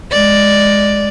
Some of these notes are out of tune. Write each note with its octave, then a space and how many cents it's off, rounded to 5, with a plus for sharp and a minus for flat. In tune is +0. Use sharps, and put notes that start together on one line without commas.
G#3 +0 D5 +0